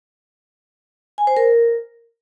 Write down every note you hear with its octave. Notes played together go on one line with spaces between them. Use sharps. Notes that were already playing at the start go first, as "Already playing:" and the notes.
G#5
C5
A#4